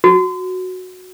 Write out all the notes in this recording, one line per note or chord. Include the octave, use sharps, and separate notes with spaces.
F#4